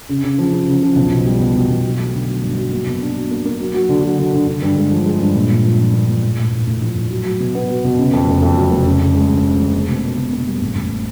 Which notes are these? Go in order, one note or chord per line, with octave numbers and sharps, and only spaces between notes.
C#3
C#3
F3
C#3
C#3
F3
B1
B2
G3
B2
B2
B1
F#3
A3
D3
F#3
G2
F#3
A#3
B2
D4
F#3
A#3
A#3
F#3
F#3
D3
F#3
D3
D3
D3
G2
G#3
F3
G#3
G2
A#2
A#2
F3
F3
A#3
A#2
A2
A2
A2
A2
F3
A2
F#3
F#3
B2
B3
F#3
B2
C#3
F2
F1
F2
F#3
F1
C#3
C#3
G#3
D2
C#3
D2
A#3
B2
B2
B2
A#3
G3
A1
A1